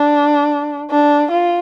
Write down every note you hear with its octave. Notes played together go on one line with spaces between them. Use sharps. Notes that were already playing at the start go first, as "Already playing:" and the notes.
Already playing: D4
D4
F4